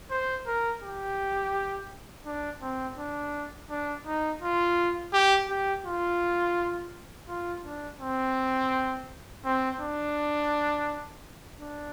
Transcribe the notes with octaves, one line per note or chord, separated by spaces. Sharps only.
C5
A#4
G4
D4
C4
D4
D4
D#4
F4
G4
G4
F4
F4
D4
C4
C4
D4
D4